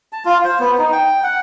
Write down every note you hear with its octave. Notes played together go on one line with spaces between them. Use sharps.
A5
F4
C5
B3
D#4
G5
F#5